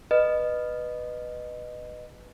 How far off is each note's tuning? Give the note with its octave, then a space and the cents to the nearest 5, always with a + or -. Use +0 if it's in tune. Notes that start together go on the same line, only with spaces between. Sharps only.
B4 +0 D#5 -20